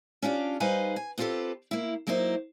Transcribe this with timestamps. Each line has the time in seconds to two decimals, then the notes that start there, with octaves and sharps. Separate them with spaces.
0.22 C#4 D4 F4 G4
0.60 G3 D#4 B4 C5 F5 G#5
0.96 G#5
1.18 B3 C4 F4 G4 A4 B4
1.71 A#3 E4
2.07 F#3 A#3 D#4 E4 C5